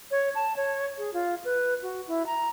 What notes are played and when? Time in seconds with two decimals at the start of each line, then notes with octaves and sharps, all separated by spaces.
0.11 C#5
0.35 A5
0.56 C#5
0.98 G#4
1.13 F4
1.45 B4
1.82 F#4
2.07 E4
2.26 A#5